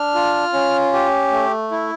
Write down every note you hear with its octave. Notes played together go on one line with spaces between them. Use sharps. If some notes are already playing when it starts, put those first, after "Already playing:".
Already playing: D4 F6
F4
C#4
G4
A3
E4